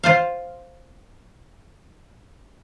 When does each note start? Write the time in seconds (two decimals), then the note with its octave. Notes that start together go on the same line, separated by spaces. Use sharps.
0.03 F4 C5 F5